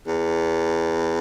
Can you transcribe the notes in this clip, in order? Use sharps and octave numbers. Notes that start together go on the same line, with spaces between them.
E2